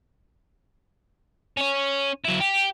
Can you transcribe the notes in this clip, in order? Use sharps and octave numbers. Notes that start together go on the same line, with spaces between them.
C#4 C#5
F#3 E4
G4